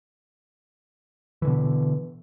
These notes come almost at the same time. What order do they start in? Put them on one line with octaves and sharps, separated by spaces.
E3 D3 B2